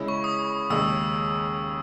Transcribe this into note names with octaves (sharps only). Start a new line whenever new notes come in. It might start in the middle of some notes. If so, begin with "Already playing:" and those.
Already playing: C#3 G#3 C#4 E4
C#6
D#6
D#2 C#3 G#3 E6